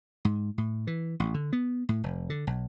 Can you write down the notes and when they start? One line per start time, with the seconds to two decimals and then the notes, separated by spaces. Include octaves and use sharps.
0.25 G#2
0.58 A2
0.87 E3
1.20 A1
1.34 D3
1.53 B3
1.89 A2
2.04 F1
2.30 D3
2.47 B1